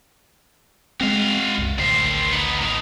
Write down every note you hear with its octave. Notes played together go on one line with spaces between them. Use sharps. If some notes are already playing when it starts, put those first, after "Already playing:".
G#3 C4 F#4 F5
C2 F#2
A1 D2 D#3 C5
B3 D#4
A2 D#4